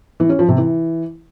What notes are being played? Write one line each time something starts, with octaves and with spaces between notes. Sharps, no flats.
E3
C#4
F3
C3
E3